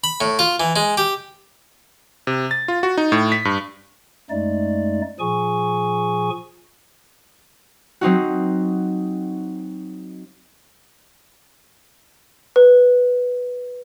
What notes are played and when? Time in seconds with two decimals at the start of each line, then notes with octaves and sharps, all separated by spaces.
0.04 B5
0.21 A2
0.39 F4
0.60 E3
0.76 G#3
0.97 G4
2.27 C3
2.51 A6
2.68 F4
2.83 F#4
2.97 D#4
3.12 A2
3.32 B6
3.45 G2
4.30 F#2 G#3 A3 D#4 D5
5.20 A#2 F3 G#4 G#5 C#6
8.01 F#3 C4 D#4 F#4
12.56 B4